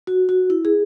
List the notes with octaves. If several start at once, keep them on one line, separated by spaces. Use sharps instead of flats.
F#4
F#4
E4
G#4